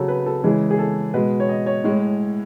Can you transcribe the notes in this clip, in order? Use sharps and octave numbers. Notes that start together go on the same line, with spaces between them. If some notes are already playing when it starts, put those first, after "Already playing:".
Already playing: C#3 F#3 A4
B4
A4
C#3 E3 G#3 G#4
G#4
A4
B2 G#3 B4
C#5
D#5
C#5
A2 G#3